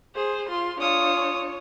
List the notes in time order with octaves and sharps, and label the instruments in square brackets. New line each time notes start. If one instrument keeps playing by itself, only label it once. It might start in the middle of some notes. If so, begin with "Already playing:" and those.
[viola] G#4 C5
F4 C6
[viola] D4 C#5 [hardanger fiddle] F4 D#6